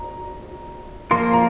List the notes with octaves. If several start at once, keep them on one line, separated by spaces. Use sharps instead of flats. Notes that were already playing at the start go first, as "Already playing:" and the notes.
Already playing: A#5
F3 A#3 F4 A#4 C6
A#5